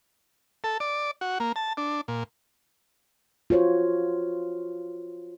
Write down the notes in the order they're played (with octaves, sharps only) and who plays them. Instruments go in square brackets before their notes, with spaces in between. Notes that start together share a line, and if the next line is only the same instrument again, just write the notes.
[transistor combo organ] A4
D5
F#4
A#3
A5
D4
A#2
[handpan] F4 F#4 C5 C#5